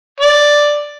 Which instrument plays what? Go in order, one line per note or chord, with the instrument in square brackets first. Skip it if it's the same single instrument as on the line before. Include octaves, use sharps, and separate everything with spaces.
[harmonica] D5